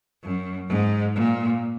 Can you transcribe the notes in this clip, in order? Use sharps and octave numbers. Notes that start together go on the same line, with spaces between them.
F#2
G#2
A#2